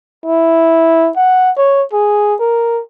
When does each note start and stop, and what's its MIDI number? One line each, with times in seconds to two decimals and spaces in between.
0.26 1.10 64
1.17 1.51 78
1.58 1.83 73
1.93 2.35 68
2.40 2.81 70